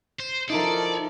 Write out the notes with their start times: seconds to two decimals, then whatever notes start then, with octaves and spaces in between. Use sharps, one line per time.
0.20 C5
0.50 F3 D#4 E4 A4 A#4 D5